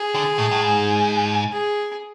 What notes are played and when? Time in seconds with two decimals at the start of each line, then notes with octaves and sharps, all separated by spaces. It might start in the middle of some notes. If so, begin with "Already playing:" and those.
Already playing: G#4
0.15 D3
0.39 A2
0.51 A2
0.61 G#2
1.52 G#4